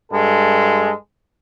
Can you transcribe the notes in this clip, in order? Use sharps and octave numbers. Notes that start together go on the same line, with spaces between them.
G2 G#3 A4